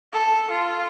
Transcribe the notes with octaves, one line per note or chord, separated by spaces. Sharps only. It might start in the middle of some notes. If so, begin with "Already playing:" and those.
A4
F4